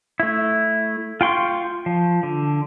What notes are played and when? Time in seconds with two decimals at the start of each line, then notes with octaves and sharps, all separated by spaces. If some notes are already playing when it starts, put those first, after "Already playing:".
0.20 A3 E4
1.21 F4 G5 C6 C#6
1.86 F3
2.23 D3